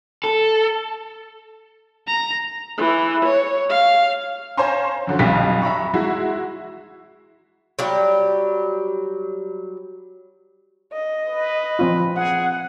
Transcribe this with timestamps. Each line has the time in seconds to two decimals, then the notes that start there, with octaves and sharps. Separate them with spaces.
0.24 A4
2.07 A#5
2.78 E3
3.25 C#5
3.70 F5
4.57 C5 C#5 F5 G#5 A#5 C6
5.07 F#2 D3 F#3
5.19 B1 F2 G3 G5 B6
5.62 E5 A#5 B5 C#6
5.94 G#3 E4 F#4
7.79 F#3 G3 G4
10.93 D#5
11.27 B4
11.79 F3 C4 F4
12.16 G#4 F#5